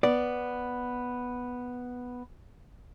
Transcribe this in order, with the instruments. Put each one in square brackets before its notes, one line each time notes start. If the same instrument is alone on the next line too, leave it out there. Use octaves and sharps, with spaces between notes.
[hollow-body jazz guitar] B3 D5